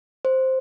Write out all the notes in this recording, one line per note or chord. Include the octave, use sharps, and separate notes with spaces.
C5